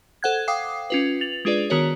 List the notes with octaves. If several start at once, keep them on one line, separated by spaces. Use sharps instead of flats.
A4 C5 F#5 F#6 G#6
F5 G5 D6 D#6 C7
C#4 F4 B4
A6 F7 F#7
G#3 D4 F4 G#4 B4 D5
D#3 B3 F#4 A#4 C#5